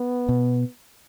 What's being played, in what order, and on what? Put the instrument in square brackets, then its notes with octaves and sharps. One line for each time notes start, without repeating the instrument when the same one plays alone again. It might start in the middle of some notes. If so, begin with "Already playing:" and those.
Already playing: [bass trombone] B3
[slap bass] B2